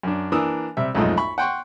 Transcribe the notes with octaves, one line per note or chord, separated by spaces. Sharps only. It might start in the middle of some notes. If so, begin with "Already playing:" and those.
F#2 D4
E3 A#3 D4 A#4 D#6 E6
C3 G3 E5
B1 F2 G#2 A3 F4 D#5
B5 C#6
F#5 G5 C6 C#6